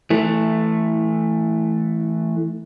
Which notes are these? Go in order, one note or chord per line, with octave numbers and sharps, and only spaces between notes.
E3 A3